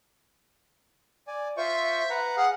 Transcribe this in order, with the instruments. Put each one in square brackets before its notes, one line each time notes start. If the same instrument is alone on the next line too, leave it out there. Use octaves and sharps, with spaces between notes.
[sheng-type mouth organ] D5 G#5
[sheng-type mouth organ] F4 C5 C#6 [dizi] E5
[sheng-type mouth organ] B4 F#5 A#5
[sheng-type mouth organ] G#4 F5 [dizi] F#5